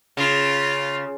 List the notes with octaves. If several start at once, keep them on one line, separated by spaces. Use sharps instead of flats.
C#3 F4